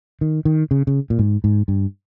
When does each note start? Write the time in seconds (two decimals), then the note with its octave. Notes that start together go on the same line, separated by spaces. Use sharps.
0.21 D#3
0.45 D#3
0.71 C#3
0.87 C#3
1.10 A#2
1.19 G#2
1.44 G#2
1.68 G2